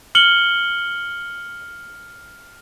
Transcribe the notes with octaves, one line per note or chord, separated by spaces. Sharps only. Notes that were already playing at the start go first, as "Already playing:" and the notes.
F6 C#7 F#7 G7